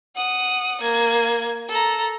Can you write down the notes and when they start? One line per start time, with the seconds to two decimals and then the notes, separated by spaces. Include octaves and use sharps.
0.16 F#5 D#6
0.81 A#3 G#6
1.69 A4 A#5